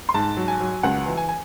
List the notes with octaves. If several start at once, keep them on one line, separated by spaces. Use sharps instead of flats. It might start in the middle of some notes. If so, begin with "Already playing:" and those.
C6
G#2 A5
F#3
G#5
F#3
C#2 F#5
E3
G#5
G#5